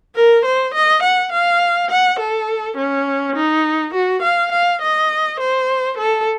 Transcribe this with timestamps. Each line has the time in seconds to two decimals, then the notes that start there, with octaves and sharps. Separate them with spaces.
0.15 A#4
0.45 C5
0.74 D#5
1.03 F#5
1.32 F5
1.91 F#5
2.19 A4
2.77 C#4
3.36 D#4
3.94 F#4
4.22 F5
4.52 F5
4.82 D#5
5.40 C5
5.98 A4